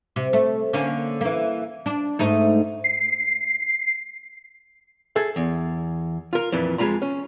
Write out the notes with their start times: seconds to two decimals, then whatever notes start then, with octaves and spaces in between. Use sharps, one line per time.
0.16 C3
0.33 A3
0.73 D3 A#3 C#4
1.21 E3 A#3
1.86 D4
2.19 G#2 A3 D#4
2.84 C7
5.16 G#4 A4 E5
5.36 E2
6.33 F4 A#4
6.52 F2 A#2 E3
6.78 F2 G#3 F4 A#5 B5
7.02 C#4